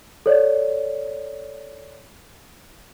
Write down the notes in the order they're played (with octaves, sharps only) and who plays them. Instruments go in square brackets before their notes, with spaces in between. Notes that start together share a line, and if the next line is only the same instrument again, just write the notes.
[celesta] A4 C#5 D5